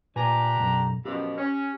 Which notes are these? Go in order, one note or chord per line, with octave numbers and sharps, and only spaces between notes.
A#2 D4 G4 B4 G#5 A#5
B1 F#2
F#2 B2 F3 G4
C#4